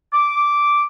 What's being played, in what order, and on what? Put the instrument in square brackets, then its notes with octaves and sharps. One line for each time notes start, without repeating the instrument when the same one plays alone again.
[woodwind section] D6